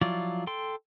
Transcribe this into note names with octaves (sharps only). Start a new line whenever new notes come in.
F3 F#3 E4 F4 D5
A4 G5 C6